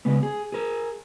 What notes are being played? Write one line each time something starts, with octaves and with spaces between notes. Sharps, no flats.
C#3 G#3 B3
G#4
G#4 A#4